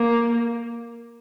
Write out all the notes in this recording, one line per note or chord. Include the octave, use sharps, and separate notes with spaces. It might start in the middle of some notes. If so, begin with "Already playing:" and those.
Already playing: A#3